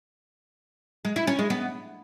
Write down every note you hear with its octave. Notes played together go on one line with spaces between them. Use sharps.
G#3
E4
C#4
G#3
B3